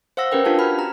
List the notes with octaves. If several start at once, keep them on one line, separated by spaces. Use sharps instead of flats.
C5 F5 F#5 E6 A#6
C#4 G4 A#4 B4 G5
D4 F4 G4 F5 A5
F#4 B5 F6
A#5